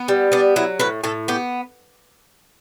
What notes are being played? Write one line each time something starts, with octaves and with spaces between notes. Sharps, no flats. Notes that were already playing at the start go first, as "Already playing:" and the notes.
Already playing: B3
G3
B3 D4
F#3 E4
A2 B4
A2 A4
B3 G4